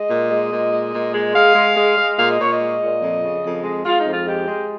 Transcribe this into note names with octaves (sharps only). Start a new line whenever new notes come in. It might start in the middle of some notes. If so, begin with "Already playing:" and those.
Already playing: G#3 D#5
A#2
G#3
A#2
G#3
A#2
G#3
G#3 F5
G#3
G#3
G#3
A#2 F5
D#5
A#2 C#5
D#5
G#3
A#2
F2
C#3
F2
G#3
G#3 F4
D#4
F2
F4
G#3 G4
G#3